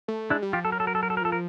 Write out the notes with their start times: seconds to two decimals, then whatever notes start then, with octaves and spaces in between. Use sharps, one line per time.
0.08 A3
0.30 G#3 D4 E4
0.42 G3
0.53 F3 F4 G4
0.65 F#3 A4
0.72 A#4
0.80 A4
0.87 A#4
0.95 A4
1.03 A#4
1.10 A4
1.17 A#4
1.22 F3 A4
1.32 A#4